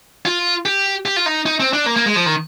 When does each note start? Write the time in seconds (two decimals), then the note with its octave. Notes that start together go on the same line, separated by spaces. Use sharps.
0.26 F4
0.66 G4
1.06 G4
1.16 F4
1.26 D#4
1.46 D#4
1.60 C4
1.73 D4
1.86 A#3
1.96 A#3
2.06 G#3
2.16 F3
2.26 D#3